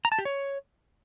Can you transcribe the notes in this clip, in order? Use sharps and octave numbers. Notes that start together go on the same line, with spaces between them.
A#5
A5
G4
C#5